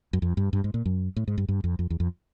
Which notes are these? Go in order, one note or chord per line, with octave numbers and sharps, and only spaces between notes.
F#2
F2
G2
G2
G#2
A#2
F#2
A2
G#2
G2
G2
F2
F2
E2
F2